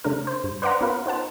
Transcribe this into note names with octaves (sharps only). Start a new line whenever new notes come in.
C#3 A3 D4 A#4
C5
G2
B4 C5 D5 F5 F#5 A#5
B3 C#4 F4 A#4 B4 F5
D#4 C5 F#5 A5